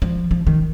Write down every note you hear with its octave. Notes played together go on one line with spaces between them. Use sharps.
F3
F3
D#3